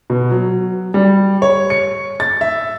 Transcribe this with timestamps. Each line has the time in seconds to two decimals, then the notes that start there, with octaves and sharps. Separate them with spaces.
0.10 B2
0.32 F#3
0.94 G3
1.42 C#5
1.70 C#7
2.20 A6
2.41 E5